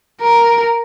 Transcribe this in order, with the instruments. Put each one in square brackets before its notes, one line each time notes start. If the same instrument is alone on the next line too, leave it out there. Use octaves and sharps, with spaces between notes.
[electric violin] A#4